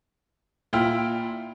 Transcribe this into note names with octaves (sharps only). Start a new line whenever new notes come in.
A#2 E4 F4 G5 F6